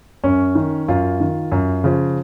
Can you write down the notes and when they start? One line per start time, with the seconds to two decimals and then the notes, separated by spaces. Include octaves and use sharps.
0.24 F#2 C#4
0.55 D#3
0.88 F#2 F4
1.20 D#3
1.52 F#2
1.84 C#3 F3